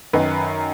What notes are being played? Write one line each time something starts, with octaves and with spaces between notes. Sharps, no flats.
F#2 D#3 B4